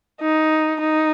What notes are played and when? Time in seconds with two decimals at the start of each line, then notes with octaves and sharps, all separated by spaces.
0.21 D#4
0.80 D#4